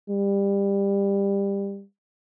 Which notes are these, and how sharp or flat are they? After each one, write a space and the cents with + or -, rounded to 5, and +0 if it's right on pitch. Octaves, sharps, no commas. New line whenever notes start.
G3 +20